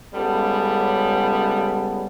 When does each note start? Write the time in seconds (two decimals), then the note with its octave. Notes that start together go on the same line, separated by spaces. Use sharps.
0.13 C#2 C#3 G3 B3 A4